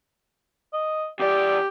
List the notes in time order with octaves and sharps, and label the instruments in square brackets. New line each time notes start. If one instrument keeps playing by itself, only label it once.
[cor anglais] D#5
[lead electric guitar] E2 D5 [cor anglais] G4